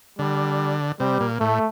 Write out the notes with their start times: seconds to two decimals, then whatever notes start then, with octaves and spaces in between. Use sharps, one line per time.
0.19 D3 G3
1.00 C3 G3
1.20 A#2
1.40 A2 A3